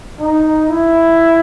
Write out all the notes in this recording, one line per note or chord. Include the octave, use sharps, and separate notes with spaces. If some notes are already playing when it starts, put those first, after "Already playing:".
D#4
E4